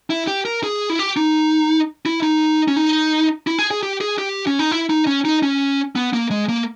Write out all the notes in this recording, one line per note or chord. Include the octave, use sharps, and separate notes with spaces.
E4
G4
A#4
G#4
E4
G4
D#4
E4
D#4
C#4
D#4
E4
G#4
G#4
G4
G#4
G4
C#4
D#4
E4
D#4
C#4
D#4
C#4
B3
A#3
G#3
A#3